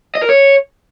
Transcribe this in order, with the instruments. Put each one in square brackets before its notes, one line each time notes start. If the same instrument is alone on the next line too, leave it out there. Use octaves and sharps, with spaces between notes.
[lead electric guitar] D#5
A#4
C#5